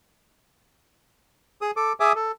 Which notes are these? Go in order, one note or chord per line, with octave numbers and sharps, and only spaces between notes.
G#4 D#6
A4 D6
G#4 E5 G#5 D6 D#6
A4